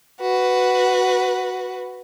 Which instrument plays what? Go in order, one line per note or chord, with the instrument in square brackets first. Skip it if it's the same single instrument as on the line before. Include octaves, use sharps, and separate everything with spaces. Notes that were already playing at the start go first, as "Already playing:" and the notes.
[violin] F#4 B4